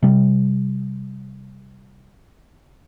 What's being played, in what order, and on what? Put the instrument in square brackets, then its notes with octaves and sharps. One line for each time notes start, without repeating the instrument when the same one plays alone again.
[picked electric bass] C3 G3